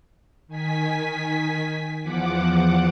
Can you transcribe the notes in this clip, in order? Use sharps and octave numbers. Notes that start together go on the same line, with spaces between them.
D#3 G#5 B6
E2 F3 F#5 D6